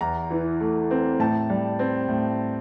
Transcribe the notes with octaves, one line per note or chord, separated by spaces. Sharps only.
E2 A#5
E3
A3
C4
A2 A5
G3
C4
A2